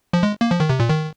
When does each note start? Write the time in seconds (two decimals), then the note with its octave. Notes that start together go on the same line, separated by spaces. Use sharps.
0.13 F3
0.23 G#3
0.41 A#3
0.51 F3
0.60 D#3
0.70 C3
0.80 A#2
0.89 D#3